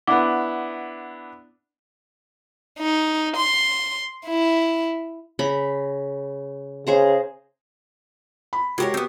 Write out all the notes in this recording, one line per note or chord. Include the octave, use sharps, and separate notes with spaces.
B3 D4 E4 F#5 D6
D#4
C6
E4
C#3 A#5 B5
C#3 G#4 C5 A#5
B5
G#3 F#4 G4 A#4 C#5
B3 C4